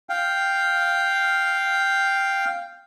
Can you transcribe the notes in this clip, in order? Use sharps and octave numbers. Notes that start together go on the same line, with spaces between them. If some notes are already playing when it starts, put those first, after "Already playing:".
F5 G5